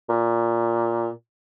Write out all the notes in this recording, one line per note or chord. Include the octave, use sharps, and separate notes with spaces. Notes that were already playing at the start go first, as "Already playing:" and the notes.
A#2